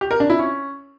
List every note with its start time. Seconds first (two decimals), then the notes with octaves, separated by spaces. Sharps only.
0.01 G4
0.11 A#4
0.20 D4
0.30 E4
0.39 C#4